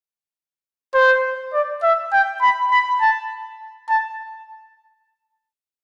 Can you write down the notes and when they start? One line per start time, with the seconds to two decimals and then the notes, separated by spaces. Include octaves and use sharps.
0.94 C5
1.53 D5
1.83 E5
2.13 G5
2.42 B5
2.71 B5
3.01 A5
3.89 A5